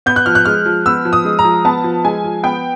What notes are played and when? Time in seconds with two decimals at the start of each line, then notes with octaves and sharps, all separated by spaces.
0.06 B3 G6
0.16 F#6
0.26 F3 F6
0.35 F#6
0.45 G#3 F6
0.66 F3
0.86 B3 E6
1.05 F3
1.13 D#6
1.25 G#3
1.39 A#5
1.45 F3
1.65 B3 A5
1.84 F3
2.05 G#3 G#5
2.24 F3
2.43 B3 G5